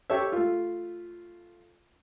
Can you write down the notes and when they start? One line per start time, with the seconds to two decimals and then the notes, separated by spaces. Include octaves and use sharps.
0.10 G4 A4 C#5 E5
0.32 A3 F4